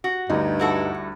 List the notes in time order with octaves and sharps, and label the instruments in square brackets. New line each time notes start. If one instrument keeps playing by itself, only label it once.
[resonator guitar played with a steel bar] F#4
[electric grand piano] D2 G3 [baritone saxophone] G2 [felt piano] D#4
[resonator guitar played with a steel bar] E4 F#4 A4